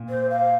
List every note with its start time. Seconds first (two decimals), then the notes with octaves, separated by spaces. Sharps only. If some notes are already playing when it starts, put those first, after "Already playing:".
Already playing: A#2
0.09 C5
0.30 F5